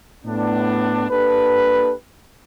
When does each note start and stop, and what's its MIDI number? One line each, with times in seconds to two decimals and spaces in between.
0.26 1.09 45
0.26 1.09 59
0.26 1.09 62
1.10 1.92 58
1.10 1.92 62
1.10 1.92 67
1.10 1.92 69
1.10 1.92 71